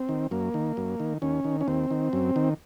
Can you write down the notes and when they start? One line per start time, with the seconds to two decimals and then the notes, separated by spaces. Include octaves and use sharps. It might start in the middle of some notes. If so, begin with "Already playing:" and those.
Already playing: C4
0.09 D#3
0.31 F#2 A#3
0.54 D#3
0.77 F#2
1.00 D#3
1.22 D#2 C#4
1.45 D#3
1.61 C#4
1.68 D#2 C4
1.91 D#3
2.13 F#2
2.36 D#3